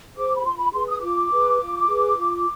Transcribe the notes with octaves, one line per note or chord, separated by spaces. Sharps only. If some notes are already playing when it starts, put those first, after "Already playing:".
G#4 C5 D6
B5
F4 C6
B5
G#4 B4 C6
D#6
F4 D6
G#4 B4
F4
G#4 B4
F4